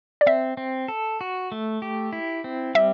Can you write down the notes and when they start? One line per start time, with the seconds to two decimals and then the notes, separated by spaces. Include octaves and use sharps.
0.21 D5
0.26 C4 E5
0.57 C4
0.88 A4
1.21 F#4
1.52 A3
1.82 G4
2.13 E4
2.44 C4
2.75 G3 E5